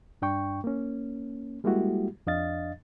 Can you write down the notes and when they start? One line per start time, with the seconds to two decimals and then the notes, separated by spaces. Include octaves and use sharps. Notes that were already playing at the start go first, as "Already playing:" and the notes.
0.22 G2 D4 G5 C#6
0.64 A#3 C#4
1.64 G3 G#3 A#3 E4 F#4 G4
2.27 F2 D4 D#5 F5 A6